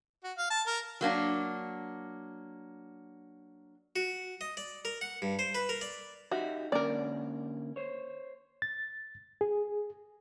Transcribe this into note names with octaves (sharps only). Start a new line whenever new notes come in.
F#4
F5
A5
A#4
F#3 A#3 D4
F#4
D#5
D5
A#4
F#5
G2
C5
B4
A#4
D5
D#4 F#4 G4 E5
D3 A#3 C#4 A#4 D5
C5 C#5
A6
G#4